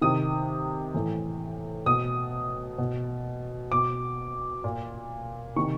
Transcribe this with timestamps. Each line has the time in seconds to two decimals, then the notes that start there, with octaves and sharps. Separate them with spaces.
0.01 C3 D#3 D#6
0.94 A2 E3
1.86 B2 D#6
2.78 B2
3.72 B2 D6
4.64 A#2
5.56 C3 D#3 C#6